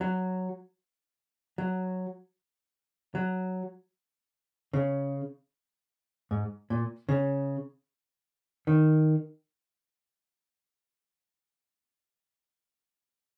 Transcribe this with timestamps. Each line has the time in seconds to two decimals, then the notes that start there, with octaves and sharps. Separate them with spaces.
0.01 F#3
1.58 F#3
3.15 F#3
4.73 C#3
6.31 G#2
6.70 A#2
7.09 C#3
8.67 D#3